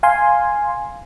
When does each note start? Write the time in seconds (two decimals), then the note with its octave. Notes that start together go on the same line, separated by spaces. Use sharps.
0.03 F5 G#5 C6